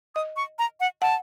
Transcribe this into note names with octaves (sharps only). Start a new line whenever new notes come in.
D#5 D#6
C#6
A#5
F#5
F#5 A5